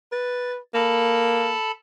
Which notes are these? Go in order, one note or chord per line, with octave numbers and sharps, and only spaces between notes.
B4 A6
A#3 A4 A5 B5